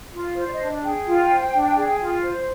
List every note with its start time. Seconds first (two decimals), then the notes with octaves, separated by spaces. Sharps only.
0.13 F4
0.36 C5
0.47 D5
0.52 D#5
0.60 D4
0.83 G#4 G5
1.07 F4
1.30 C5
1.53 D4
1.77 G#4
2.00 F4
2.24 C5